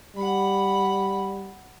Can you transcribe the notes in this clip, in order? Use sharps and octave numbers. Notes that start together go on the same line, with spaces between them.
G3 F#5 B5